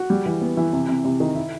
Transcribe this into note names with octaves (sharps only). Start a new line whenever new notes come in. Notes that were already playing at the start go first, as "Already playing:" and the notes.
Already playing: F#4
G3
E3
B3
E3
C3
C3
C3
D#3
E4